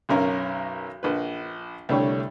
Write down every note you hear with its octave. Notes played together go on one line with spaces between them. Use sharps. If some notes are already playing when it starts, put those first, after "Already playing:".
B1 F#2 C#4 A#4 F5
A#1 B4
C2 D3 G3 A3 C#5